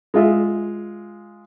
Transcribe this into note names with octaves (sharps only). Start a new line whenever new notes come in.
G#3 F4 E5